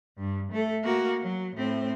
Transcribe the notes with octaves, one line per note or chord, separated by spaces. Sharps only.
G2
A3 A4
A#3 F#4
F#3
A2 C4